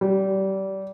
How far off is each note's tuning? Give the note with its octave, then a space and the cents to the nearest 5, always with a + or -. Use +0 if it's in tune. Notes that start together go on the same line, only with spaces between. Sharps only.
G3 -25